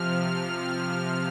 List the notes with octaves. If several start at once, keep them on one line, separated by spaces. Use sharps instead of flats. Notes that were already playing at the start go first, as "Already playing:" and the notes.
Already playing: C3 F3 F6